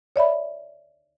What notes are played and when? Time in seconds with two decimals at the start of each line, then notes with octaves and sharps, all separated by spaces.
0.16 C#5 D5 E5 B5